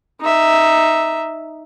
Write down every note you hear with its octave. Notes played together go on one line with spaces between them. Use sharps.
D#4 E5